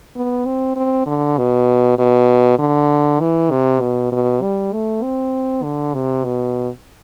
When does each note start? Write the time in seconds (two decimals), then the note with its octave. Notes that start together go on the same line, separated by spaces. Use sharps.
0.16 B3
0.46 C4
0.76 C4
1.06 D3
1.38 B2
1.98 B2
2.59 D3
3.20 E3
3.51 C3
3.81 B2
4.12 B2
4.42 G3
4.73 A3
5.03 C4
5.63 D3
5.94 C3
6.25 B2